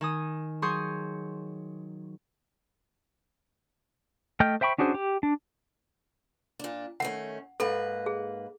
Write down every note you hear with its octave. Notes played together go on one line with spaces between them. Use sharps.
D#3 G#5 D#6
F#3 G#4 C6 C#6 D#6 G6
A3 D#5 G5 F6 G6
C5 E5 G5 B5 C#6
C#4 D4 F#4 G#4 C5
G4
D4
A#2 D4
D#3 A3 C#4 F#5
G#2 A#3 A4 B4
G#4